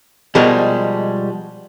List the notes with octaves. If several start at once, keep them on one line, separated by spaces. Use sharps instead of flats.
B2 F3 G3 G#3 A#4